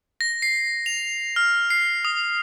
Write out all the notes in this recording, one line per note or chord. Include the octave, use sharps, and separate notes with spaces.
A#6
C7
F7
F6
C7
D#6